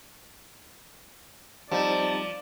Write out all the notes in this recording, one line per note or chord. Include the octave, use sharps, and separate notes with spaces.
F3 G3 C4 D#4 D5 A5